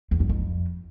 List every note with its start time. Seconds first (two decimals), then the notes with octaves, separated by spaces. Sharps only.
0.11 E2
0.20 G2
0.29 F2